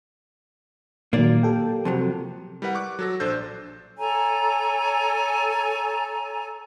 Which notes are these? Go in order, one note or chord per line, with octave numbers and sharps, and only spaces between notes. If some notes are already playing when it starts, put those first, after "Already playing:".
A#2 D#3 F#3 A#3 A#4 D5
G4 A4 G5
F2 C3 F#3
G3 E4 A#4 B4 F#5
C#6 D6 F#6
F#3 A4 A#6
A#1 D4 A4 C5 E6 G6
A4 C#5 G#5 A#5